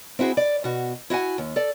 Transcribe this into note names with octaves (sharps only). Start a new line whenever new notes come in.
C4 E4 F#4 G#4
D5
B2 F#4
E4 F#4 F#5 G#5
D#2
A4 D5